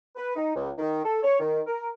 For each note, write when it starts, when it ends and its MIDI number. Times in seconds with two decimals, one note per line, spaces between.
0.16 0.35 71
0.36 0.54 63
0.55 0.70 37
0.77 1.01 51
1.04 1.18 69
1.23 1.37 73
1.39 1.61 51
1.67 1.89 70